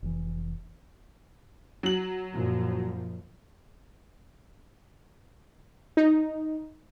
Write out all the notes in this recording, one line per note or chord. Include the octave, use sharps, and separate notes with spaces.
F1 E3
F#3 F#7
F#2 A#2 F3
D#4